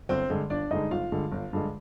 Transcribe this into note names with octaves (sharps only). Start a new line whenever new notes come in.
G1 C4 C5
G2 D3 G#3
G1 D4 D5
G2 D3 G#3 D#4 D#5
G1 F4 F5
G2 D3 G#3
G1
G2 D3 G#3